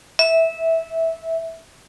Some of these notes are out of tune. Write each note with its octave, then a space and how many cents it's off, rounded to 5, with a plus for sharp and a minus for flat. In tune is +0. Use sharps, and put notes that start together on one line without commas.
E5 -15